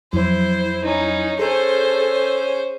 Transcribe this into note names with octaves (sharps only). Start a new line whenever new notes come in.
F2 F#3 E4 C5
C#4 D#4
C#4 G#4 A4 C5